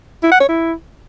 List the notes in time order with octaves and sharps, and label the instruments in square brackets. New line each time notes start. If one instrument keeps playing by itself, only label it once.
[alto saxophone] E4
F#5
C#5
E4